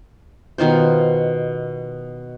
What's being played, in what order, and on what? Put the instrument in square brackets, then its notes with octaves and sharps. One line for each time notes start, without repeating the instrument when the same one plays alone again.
[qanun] B2 D#3 F4 C5